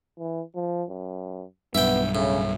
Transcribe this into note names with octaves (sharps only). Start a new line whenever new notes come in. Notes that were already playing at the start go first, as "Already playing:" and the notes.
E3
F3
F#2
B1 G2 B3 E5 G5
A2 C#3